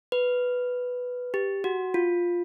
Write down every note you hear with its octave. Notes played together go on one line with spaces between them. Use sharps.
B4
G4
F#4
F4